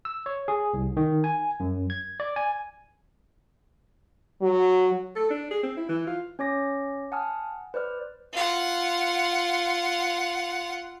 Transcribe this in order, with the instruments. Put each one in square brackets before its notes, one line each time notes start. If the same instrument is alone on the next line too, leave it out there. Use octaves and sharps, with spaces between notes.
[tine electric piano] E6
C#5
G#4
C2
D#3
G#5
F#2
G#6
D5
G#5
[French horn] F#3
[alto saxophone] A4
D4
G#4
C4
E4
E3
F4
[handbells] C#4 C#5 D6 A#6
F#5 G#5 A5 D#6 F6
B4 C5 D5 F6
[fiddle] F4 F#5